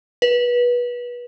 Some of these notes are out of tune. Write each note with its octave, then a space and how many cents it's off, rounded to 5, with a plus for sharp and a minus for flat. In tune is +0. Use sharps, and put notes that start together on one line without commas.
B4 -25